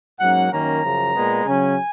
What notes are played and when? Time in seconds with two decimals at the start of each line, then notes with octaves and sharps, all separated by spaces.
0.19 G#2 F#3 A#3 C#4 F#5
0.51 F#2 D#3 A#3 C#4 A#5
0.82 F#2 C#3 F3
1.15 A#2 G#3 B3
1.45 C#3 F#3 C#4 G#5